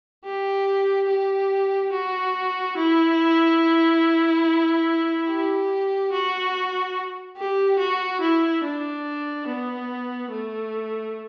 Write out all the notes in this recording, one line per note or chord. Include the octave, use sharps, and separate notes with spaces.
G4
G4
F#4
E4
G4
F#4
G4
F#4
E4
D4
B3
A3